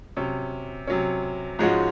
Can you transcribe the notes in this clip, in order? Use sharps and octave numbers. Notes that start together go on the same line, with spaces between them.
C3 F#3 C#4
C3 F#3 C#4
G#2 F3 G#3 C#4 F#4